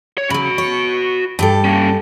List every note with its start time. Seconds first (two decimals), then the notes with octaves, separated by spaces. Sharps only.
0.18 C#5
0.30 C#3 F#3 F#4 B5
0.58 C#5
1.39 G2 G4 A4
1.64 A#3 C#4